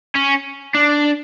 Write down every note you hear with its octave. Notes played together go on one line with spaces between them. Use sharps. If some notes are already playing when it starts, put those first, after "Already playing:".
C#4
D4